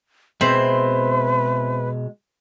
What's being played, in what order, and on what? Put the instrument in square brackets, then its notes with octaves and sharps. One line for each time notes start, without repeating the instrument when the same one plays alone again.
[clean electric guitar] B2 G#3 [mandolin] C4 E4 C5 [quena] B4